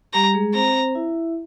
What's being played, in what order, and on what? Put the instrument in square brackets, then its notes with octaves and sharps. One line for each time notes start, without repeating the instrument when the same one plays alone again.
[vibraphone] G3 G4 [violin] A#5
[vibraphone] G#3 G#4
[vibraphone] C4 C5 [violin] A#5
[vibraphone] E4 E5